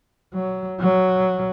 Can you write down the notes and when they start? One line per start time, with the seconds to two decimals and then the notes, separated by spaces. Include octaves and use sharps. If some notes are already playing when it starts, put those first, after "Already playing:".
0.34 F#3
0.80 F#3